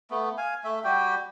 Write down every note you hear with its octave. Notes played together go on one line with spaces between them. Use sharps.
A3 B3
F5 G#5
A3 E5
G3 F#4 G4 G5